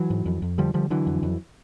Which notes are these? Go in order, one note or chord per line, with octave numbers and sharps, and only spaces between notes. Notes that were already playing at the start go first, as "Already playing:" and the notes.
Already playing: E3 F#3
G#2
F2
F2
D3 F3 G3
D3 F3 G3
D3 E3 F#3
F2
F2